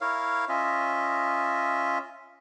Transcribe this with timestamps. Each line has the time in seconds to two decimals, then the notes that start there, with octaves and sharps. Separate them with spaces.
0.01 E4 A#4 C#5 F5
0.49 C#4 F4 D#5 E5